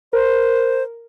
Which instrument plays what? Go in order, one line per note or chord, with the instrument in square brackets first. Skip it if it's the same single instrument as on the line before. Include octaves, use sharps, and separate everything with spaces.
[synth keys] A#4 [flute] C5